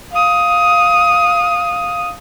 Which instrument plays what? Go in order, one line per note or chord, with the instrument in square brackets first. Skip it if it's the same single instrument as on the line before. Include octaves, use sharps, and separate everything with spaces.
[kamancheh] F5 D#6